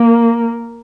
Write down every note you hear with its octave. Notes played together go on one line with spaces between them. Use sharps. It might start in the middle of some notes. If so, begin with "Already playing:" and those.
Already playing: A#3